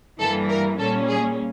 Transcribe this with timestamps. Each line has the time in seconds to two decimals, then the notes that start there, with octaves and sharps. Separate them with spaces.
0.20 G2 E3 G3 A#3 A4
0.49 A#4
0.79 A#2 G3 A#3 C#4 A4
1.08 G#4